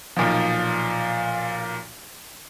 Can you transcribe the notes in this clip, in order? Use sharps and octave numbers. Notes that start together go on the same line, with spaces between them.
B1 A#2 F3